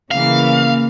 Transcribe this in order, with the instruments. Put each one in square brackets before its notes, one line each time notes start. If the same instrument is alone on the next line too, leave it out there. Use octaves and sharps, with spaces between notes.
[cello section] C#3 E3 A#3 [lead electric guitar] F5